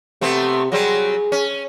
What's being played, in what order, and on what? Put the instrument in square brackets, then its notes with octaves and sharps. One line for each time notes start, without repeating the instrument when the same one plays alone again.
[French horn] C3 [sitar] A3 B3 C4
[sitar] F#3 G3 C4 [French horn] G#4
[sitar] C#4